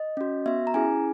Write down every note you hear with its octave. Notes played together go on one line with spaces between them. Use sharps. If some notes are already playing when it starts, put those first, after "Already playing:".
Already playing: D#5
C#4 F#4
B3 F#4 E5
A#5
C#4 E4 G#4 G#5